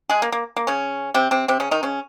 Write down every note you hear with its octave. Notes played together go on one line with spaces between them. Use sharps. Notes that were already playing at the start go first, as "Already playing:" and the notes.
G#3 G#4
A#3
A#3
A#3
C#3 C#4
C3 C4
C3 C4
C3 C4
C#3 C#4
D#3 D#4
C#3 C#4